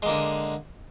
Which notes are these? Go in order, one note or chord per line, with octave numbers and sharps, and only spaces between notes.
D3 G#3 A#3